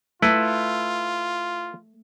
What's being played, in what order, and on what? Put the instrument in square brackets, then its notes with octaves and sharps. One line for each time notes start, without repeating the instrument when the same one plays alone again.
[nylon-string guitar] A3 [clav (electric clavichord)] E4 A4 B4 [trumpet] F4